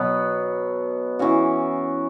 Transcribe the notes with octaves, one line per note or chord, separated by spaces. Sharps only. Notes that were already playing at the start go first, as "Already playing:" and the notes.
Already playing: B2 F#3 B3
E3 C#4 F#4